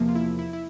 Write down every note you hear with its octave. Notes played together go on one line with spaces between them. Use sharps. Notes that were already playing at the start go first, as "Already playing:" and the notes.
Already playing: E2 C3 F3 A#3
F4
E4
E4
E4